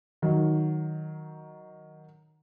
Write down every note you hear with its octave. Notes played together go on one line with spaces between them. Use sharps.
D#3 F#3